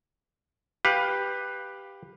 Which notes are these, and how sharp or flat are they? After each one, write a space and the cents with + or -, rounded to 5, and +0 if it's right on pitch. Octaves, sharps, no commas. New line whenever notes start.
G4 +10 B4 +0 F5 +25